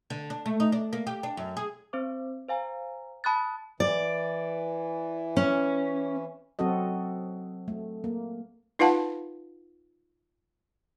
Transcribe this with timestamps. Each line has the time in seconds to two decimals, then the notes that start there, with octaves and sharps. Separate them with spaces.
0.10 D3
0.30 D4
0.46 A3
0.60 D#4
0.72 D4
0.93 A#3
1.07 G4
1.23 D4
1.37 F#2
1.57 G#4
1.93 C4 C5 D6
2.49 C5 F5 G#5 A#5
3.24 A5 B5 D#6 F#6 A6
3.80 E3 D5
5.37 C#4
6.59 F#3 C4 F#4 A4 D#5
7.68 A3
8.04 A#3
8.79 D#4 F4 B4 F5 F#5 A5